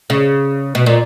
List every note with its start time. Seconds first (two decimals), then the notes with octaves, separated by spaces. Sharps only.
0.10 C#3
0.75 B2
0.86 A#2